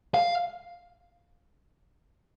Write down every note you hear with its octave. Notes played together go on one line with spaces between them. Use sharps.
F5